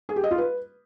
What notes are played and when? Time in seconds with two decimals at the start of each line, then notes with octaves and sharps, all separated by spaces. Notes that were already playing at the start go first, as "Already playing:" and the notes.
0.09 G#4
0.16 G4
0.24 D#5
0.31 F4
0.38 B4